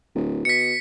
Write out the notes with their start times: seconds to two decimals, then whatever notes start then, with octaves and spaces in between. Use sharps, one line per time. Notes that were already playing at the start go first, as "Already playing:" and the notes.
0.15 D1
0.45 B2 B6 C#7